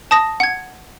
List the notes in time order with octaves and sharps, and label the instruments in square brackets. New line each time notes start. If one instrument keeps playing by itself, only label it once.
[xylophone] A5 D#6 A#6
F#5 G#6